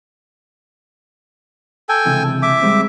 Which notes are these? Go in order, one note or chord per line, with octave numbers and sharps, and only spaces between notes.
A4 G5 G#5
C#2 C3 E3
E5 D6
G3 G#3 C4